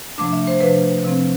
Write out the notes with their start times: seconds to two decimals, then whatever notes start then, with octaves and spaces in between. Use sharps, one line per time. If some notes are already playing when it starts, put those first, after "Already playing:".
0.18 C3 F3 A3 D4 D6
0.32 E5
0.47 C5
0.61 C3 F3 A3 D4 B4
1.04 C3 F3 C4